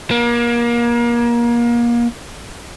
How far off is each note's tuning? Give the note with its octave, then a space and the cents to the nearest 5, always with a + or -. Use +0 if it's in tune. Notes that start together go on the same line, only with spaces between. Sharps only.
A#3 +30